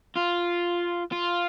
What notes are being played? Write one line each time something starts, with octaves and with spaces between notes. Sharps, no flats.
F4
F4